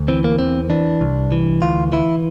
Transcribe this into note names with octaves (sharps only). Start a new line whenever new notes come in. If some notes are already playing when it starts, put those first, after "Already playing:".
Already playing: D2
E3 C4
A#3
E2 C4
E3 D4
C2
E3
D2 F4
E3 E4